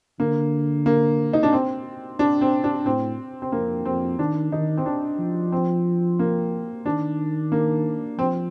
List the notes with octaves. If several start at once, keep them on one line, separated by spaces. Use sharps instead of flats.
D3 A#3
A#3
D#4
D4
C4
D4
C4
D4
A2 C4
C4
F2 A#3
F2 C4
D#3 D4
D#3 D#4
C4
D4
F3
C4
A#3
D#3 D4
A#3
F3 C4